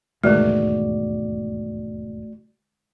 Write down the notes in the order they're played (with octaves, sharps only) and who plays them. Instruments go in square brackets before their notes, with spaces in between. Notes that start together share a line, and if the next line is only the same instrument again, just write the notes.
[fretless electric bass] E1 D#2 G#2 [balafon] D3 G#3 [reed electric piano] A3 F#4 D5